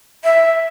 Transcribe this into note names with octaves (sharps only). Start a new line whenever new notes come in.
E5